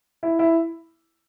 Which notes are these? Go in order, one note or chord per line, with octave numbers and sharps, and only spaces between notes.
E4
E4